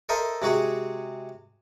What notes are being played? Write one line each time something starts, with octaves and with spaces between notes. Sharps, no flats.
A4 A#4 C5 D#5 E5
C3 G#3 F#4 G#4